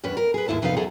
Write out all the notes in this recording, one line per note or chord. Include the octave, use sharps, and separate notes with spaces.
E2 G2 C#4 D4 B4
A#4
G#4 B4
D#2 G#2 E4 A5
F2 C3 B3 D#4 B4 F5
E2 F#3 G#4 A4 F#5 A#5